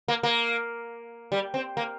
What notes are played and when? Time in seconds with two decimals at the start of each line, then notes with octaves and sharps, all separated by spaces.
0.08 A#3
0.23 A#3
1.32 G3
1.54 C4
1.77 A#3